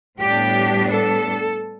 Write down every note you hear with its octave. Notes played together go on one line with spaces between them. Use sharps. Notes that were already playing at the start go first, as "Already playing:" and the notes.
A2 G3 B3 D4 G4
A4